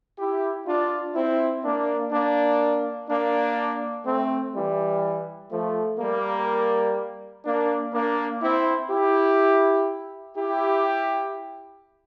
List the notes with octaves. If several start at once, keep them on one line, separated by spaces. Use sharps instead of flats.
E4 G4
D4 F4
C4 E4
A#3 D4
A#3 D4
A#3 D4
A3 C4
E3 G3
F3 A3
G3 A#3
A#3 D4
A#3 D4
C4 E4
E4 G4
E4 G4